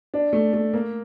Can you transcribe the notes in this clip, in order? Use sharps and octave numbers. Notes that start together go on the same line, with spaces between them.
D4
A3
A3
A#3